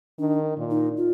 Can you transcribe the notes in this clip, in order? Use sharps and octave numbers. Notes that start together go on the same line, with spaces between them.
D#3 D4
A#2
D#4
F4